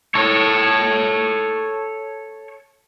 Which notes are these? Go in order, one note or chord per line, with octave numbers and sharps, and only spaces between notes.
A4 C#5